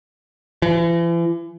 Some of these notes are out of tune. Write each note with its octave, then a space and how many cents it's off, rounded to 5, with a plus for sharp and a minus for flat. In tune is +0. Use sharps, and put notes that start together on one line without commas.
E3 +40